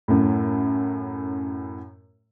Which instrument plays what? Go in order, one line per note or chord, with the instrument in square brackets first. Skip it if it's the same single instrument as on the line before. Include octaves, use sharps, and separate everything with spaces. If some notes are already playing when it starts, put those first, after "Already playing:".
[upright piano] F#2 A2